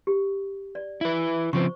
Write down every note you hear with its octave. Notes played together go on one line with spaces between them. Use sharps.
G4
D5
E4 B4
C#3 F3 C4 C5 C#6